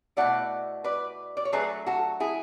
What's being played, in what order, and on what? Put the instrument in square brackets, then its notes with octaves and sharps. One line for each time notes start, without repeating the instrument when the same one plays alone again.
[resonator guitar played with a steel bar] B2 A3 E4 D5 F#5
B4 D5
D5
C#5
F#3 A3 D4 G#4 B4
F#4 A4
E4 G#4